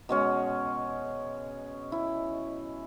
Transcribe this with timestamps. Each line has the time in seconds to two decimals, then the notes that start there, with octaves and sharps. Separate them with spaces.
0.09 B2 G#3 C#4
1.92 E4